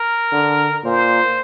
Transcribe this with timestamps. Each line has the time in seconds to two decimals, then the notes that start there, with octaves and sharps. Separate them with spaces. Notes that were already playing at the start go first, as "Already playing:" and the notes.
Already playing: A#4
0.32 D3
0.84 A#2 C5